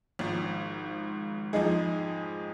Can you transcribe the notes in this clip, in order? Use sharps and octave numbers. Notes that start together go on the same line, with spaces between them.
G#1 G#2 F3
F2 F3 G#3 D#4 G#4